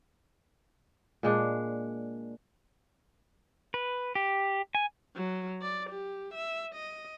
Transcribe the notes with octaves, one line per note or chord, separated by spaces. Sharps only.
A#2 G#3 D4
B4
G4
G#5
F#3
D5
G4
E5
D#5